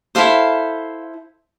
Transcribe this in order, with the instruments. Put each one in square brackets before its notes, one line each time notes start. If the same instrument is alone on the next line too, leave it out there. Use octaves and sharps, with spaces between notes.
[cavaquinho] E4 A4 C5 F5